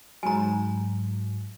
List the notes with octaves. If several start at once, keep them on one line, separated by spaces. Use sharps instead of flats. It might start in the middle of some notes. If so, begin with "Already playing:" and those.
G#2 F#3 G#5 A#5